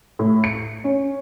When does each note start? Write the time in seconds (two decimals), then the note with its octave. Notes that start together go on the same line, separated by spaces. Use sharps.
0.19 A2
0.44 C#7
0.84 C#4